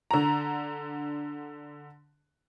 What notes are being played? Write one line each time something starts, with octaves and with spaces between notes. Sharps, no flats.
D3 A#5